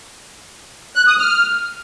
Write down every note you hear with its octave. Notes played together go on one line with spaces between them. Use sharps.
F#6
D#6
F6